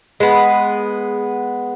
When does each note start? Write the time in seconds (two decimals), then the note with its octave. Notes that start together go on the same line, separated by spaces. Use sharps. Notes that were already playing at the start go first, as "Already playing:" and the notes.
0.20 G#3 B3